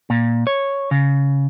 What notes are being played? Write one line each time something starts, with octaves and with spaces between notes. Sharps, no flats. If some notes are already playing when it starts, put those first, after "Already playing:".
A#2
C#5
C#3